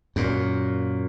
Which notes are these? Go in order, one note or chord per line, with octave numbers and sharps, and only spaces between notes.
F#2 A#2